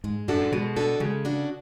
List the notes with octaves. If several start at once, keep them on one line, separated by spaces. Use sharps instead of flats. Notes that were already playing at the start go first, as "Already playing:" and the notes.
G#2 G#3
F#2 D4 F#4 A4
G#2
B2 G#3
D4 F#4 A4
C#3 G#3
D4 F#4 A4